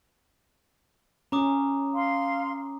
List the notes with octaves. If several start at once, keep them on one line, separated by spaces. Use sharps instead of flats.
C#4 A#5 D6 D#6
F5 C6